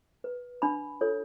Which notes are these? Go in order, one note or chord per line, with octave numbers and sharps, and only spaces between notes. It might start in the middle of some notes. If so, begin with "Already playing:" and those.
B4
D4 B5
F4 A4 C#5